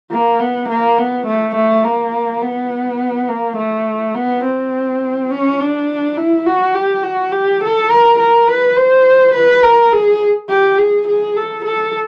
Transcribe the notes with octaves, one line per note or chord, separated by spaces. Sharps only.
A#3
B3
A#3
B3
A3
A3
A#3
B3
A#3
A3
B3
C4
C#4
D4
E4
F#4
G4
F#4
G4
A4
A#4
A#4
B4
C5
B4
A#4
G#4
G4
G#4
G#4
A4
A4